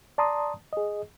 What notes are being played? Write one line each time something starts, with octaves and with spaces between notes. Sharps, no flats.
D5 A5 A#5 C6 D#6
G#4 D#5